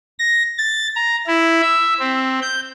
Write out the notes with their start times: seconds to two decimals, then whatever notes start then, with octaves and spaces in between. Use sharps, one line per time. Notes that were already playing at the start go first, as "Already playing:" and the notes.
0.19 A#6
0.58 A6
0.96 A#5
1.27 E4
1.61 E5
2.00 C4
2.42 G6